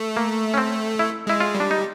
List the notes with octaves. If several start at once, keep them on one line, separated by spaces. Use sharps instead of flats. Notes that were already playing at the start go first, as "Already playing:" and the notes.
Already playing: A3
A#3
C#4
C4
E4
G#3 E4
F4
G3
D4
D#4